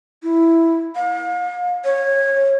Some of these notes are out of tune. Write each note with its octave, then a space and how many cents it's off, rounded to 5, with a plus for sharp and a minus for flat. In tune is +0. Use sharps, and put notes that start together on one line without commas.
E4 +0
F5 +40
C#5 -20